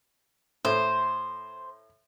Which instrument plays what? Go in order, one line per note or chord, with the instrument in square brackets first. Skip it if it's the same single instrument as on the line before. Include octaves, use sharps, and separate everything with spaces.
[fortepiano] A2 [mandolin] C5